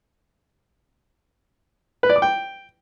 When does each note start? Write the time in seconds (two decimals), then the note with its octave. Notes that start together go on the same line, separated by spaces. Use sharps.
2.03 B4
2.09 D5
2.16 D6
2.22 G5